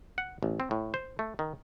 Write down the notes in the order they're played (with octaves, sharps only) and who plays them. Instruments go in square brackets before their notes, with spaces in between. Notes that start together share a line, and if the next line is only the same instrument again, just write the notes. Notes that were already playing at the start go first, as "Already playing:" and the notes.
[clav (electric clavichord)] F#5
A1
C4
A2
C5
A3
D#3